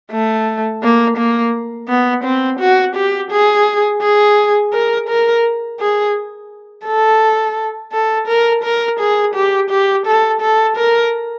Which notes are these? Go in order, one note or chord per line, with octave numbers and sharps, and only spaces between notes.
A3
A#3
A#3
B3
C4
F#4
G4
G#4
G#4
A#4
A#4
G#4
A4
A4
A#4
A#4
G#4
G4
G4
A4
A4
A#4